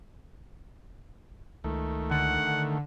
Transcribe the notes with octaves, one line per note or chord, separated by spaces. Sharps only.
C#2 D#3 A3
D3 F#5